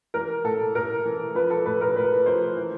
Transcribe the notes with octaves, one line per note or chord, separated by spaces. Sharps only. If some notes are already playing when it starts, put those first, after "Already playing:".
E3 A#4
A2 A4
A2 A#4
E3
F3 B4
A4
A2 B4
A#4
A2 B4
F3 C5
E3